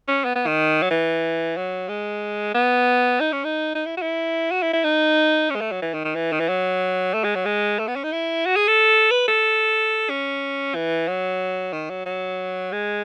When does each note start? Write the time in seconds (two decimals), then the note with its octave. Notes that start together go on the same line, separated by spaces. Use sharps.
0.08 C#4
0.25 B3
0.36 B3
0.47 D#3
0.82 F#3
0.90 E3
1.57 F#3
1.89 G#3
2.54 B3
3.20 D#4
3.32 C#4
3.44 D#4
3.75 D#4
3.86 E4
3.97 F#4
4.02 E4
4.51 F#4
4.62 E4
4.73 E4
4.84 D#4
5.50 C#4
5.55 G#3
5.61 A3
5.72 F#3
5.82 E3
5.94 D#3
6.05 D#3
6.15 E3
6.32 D#3
6.40 E3
6.48 F#3
7.14 A3
7.24 G#3
7.35 F#3
7.45 G#3
7.79 A3
7.88 B3
7.96 C#4
8.04 D#4
8.12 E4
8.46 F#4
8.56 G#4
8.67 A4
9.11 B4
9.28 A4
10.09 C#4
10.75 E3
11.08 F#3
11.73 D#3
11.90 F#3
12.06 F#3
12.72 G#3